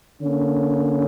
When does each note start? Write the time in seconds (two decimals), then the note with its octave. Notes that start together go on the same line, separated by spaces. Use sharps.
0.22 D3 A#3 C#4